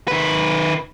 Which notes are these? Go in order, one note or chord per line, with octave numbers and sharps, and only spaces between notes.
D#3 B4